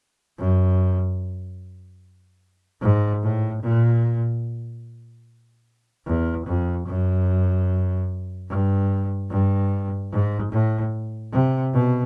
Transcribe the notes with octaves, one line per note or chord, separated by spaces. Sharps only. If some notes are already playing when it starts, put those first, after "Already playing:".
F#2
G#2
A2
A#2
E2
F2
F#2
G2
G2
G#2
A2
C3
B2